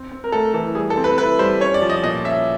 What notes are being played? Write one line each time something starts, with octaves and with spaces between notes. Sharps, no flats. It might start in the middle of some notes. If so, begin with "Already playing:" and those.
Already playing: C4
C4
A#4
A3 A4
E3 A4
G3 G#4
A4
C4
B4
E4 B4
G3 C5
C#4 C#5
D5
F3
D#5
A#2 D#5
C#4 E5